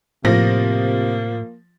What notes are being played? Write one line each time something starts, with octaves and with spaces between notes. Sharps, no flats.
A2 C3 F3 A#3 A#6